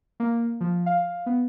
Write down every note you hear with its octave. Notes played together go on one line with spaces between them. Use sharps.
A#3
F3
F5
B3